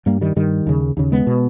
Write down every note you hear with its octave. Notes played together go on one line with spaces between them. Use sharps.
G2 G3 A#3
D#3 G3
G2 D#3 G3
D#2 C#3
D#2 C#3
G#3 B3
B2